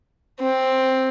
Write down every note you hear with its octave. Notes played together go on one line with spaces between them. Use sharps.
C4